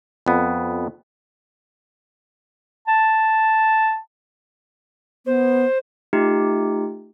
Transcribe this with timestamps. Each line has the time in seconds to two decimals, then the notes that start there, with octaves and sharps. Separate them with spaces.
0.26 F2 B3
2.88 A5
5.26 B3 C5
6.13 A3 D#4 F4 G4